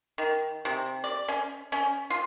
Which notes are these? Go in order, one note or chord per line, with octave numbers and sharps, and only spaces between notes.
D#3
C3
D5
C#4
C#4
F4